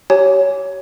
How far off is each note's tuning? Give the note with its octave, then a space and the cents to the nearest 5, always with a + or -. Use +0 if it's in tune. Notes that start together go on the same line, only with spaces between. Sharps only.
G4 -30 C#5 +10 G#5 +0